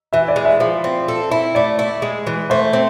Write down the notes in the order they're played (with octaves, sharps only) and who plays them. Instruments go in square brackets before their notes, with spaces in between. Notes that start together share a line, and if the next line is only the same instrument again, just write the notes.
[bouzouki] E3 [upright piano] E5
[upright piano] D5
[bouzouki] G#3
[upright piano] E5
[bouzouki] F3
C4
A4
E4
[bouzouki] A3 [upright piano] D5
[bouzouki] E4
G#3
E3
[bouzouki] A3 [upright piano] C5
[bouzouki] C4